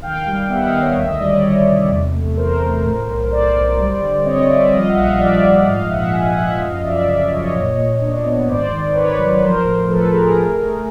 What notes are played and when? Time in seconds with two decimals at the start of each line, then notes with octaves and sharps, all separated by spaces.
0.02 D#3 F5 G5
0.26 G3
0.49 B3 E5 F#5
0.65 D#5 F5
0.73 D#3
0.80 C#5 D#5
0.96 D2 E5
1.08 D#5
1.19 G3 D5
1.32 C#5 D#5
1.44 G3
1.67 C3
1.91 E2
2.14 A3
2.37 E3 A#4 C5
2.61 A3
2.84 A2
3.08 B1
3.31 B1 C5 D5
3.55 B1
3.78 G3
4.02 D3
4.25 C4 C#5 D#5
4.48 G3 D5 E5
4.72 F3 D#5 F5
4.88 E5 F#5
4.96 A#1
5.03 D#5 F5
5.18 F3 D5 E5
5.42 F3
5.58 F#5
5.65 G#2 D#5 F5
5.89 A#1 E5 F#5
6.12 A#1 F#5 G#5
6.36 F3 E5 F#5
6.60 F#2 D#5 F5
6.83 F#2 D5 E5
7.07 C#3 D5 E5
7.30 F#2 C#5 D#5
7.54 A#2
7.77 A#2
8.01 D4
8.24 B3
8.47 G#1 C5 D5
8.72 D#3
8.94 D#3 B4 C#5
9.18 F#3
9.37 B4
9.41 F3 A#4 C5
9.65 A2
9.89 F3 A4 B4
10.12 F3 G#4 A#4
10.36 A3
10.59 A3